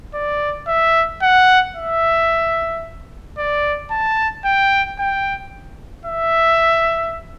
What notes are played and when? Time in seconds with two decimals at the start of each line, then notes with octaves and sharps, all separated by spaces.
0.14 D5
0.67 E5
1.22 F#5
1.76 E5
3.38 D5
3.91 A5
4.45 G5
4.99 G5
6.06 E5